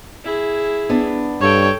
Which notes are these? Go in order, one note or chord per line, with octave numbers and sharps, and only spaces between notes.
E4 G#4
B3 D4
G2 A4 C#5 G5